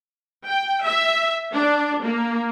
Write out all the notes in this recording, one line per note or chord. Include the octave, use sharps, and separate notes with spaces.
G5
E5
D4
A#3